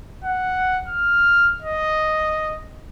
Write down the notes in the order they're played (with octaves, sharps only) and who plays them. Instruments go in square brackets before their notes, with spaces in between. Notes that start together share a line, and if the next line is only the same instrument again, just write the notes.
[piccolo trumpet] F#5
F6
D#5